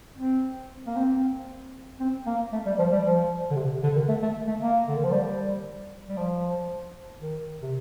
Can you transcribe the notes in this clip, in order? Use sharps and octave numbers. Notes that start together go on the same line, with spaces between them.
C4
A#3
C4
C4
A#3
A3
G3
F3
G3
F3
D3
C3
D3
D#3
A3
A3
A3
A#3
D3
D#3
F3
G3
G3
F3
D#3
C3